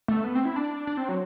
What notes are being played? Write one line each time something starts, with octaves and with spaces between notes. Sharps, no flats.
A3
B3
C4
E4
D4
D4
C4
F#3